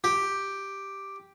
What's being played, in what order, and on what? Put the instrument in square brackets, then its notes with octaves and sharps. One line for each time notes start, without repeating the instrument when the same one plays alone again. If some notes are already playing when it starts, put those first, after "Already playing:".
[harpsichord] G4